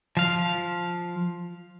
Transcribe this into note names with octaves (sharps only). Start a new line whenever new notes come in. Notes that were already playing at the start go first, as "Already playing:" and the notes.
F3 F5